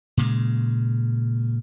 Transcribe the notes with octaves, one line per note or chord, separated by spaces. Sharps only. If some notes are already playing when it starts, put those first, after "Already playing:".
A#2 C#3 G#3